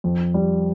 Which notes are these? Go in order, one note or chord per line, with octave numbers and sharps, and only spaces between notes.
F2
G3